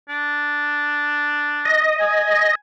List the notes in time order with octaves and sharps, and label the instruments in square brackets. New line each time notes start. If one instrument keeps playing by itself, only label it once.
[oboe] D4
[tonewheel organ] D#5
[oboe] G#5